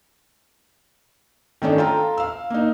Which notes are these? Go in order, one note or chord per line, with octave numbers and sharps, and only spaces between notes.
D#3 A3 C#4 D4
F4 A4 G5 A#5
F5 E6
A#3 D#4